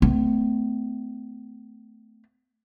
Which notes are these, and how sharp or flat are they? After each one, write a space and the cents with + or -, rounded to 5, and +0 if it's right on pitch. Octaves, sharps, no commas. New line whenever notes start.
A3 +0 C4 -45